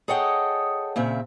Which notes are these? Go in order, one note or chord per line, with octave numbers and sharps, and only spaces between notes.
G#4 A4 C#5 D#5 F#5 G5
A#2 C#3 C4 E5